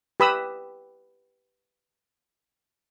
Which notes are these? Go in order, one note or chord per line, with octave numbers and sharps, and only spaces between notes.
G4 B4 B5 D#6 E6